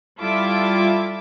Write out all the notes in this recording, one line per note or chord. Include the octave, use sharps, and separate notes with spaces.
G3 E4 F4 A4 E5 D6